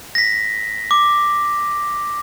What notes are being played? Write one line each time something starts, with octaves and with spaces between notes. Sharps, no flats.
A#6 B6
D6